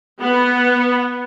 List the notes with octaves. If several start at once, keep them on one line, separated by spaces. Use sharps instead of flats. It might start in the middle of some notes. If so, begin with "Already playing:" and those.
B3